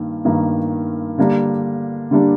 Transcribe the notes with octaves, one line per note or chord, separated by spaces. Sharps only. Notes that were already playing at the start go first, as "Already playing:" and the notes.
Already playing: G2 D#3 A#3
G2 D#3 A#3
D3 G3 A#3 D4
D3 G3 A#3 D4